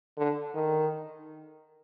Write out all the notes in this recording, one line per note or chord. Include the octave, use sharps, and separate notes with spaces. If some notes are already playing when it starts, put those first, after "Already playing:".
D3
D#3